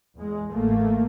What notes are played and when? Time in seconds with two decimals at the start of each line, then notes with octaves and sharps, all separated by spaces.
0.17 E2 G#3
0.52 A1 A3 A#3